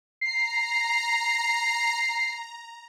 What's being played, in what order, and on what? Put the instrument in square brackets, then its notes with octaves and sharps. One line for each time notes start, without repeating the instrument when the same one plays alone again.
[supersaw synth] A#5 [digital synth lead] C7